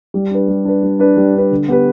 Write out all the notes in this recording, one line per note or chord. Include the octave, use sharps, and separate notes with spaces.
G3
D4 B4
G3
D4 B4
G3
D4 B4
G3
D4 B4
D3
B3 G4 B4